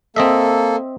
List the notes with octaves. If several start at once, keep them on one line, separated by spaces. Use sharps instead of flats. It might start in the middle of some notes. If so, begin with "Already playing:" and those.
A#3 C4 A4 D#5 E5